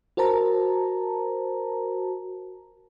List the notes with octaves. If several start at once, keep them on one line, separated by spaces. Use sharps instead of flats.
F#4 A#4 C5 A5 A#5